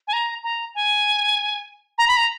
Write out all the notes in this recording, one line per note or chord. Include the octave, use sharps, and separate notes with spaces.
G#5
A#5
A#5
G#5
A#5
B5
A#5